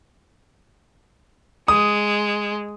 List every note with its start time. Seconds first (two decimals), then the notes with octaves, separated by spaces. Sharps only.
1.68 G#3 D#6